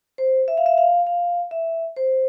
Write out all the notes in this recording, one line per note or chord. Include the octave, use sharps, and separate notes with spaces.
C5
E5
F5
E5
F5
F5
E5
C5